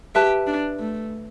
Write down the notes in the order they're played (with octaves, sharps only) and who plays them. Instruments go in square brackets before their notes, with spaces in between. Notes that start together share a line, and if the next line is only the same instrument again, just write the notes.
[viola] G4 [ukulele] B4 E5 A5
[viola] D4
A3